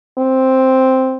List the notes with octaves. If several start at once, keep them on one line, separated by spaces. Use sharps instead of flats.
C4